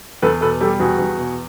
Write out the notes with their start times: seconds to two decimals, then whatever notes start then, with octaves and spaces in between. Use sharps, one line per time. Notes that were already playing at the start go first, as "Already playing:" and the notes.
0.22 E2 A4 B4
0.41 B2 A4 B4
0.61 G3 G4 A4
0.80 E2 F#4 G#4
0.99 E2
1.18 B2